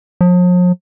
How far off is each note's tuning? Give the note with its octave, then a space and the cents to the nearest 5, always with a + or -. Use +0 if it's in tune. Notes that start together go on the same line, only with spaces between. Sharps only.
F3 +45